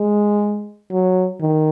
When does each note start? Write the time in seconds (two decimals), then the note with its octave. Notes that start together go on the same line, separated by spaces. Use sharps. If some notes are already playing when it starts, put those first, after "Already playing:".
Already playing: G#3
0.92 F#3
1.41 D#3